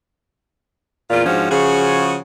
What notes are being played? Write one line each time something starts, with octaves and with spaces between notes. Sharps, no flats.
E2 A#2 F4
G#2 F3 C#4 D4 F#4
C#3 F3 F#4 G#4